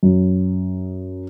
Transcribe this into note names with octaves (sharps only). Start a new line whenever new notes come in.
F#2